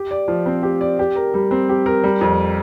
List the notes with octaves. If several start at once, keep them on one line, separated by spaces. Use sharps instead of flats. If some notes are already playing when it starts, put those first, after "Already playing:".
Already playing: G4
D5
F3
C4
G4
D5
G4
A#4
G3
C4
G4
A#4
G3
F2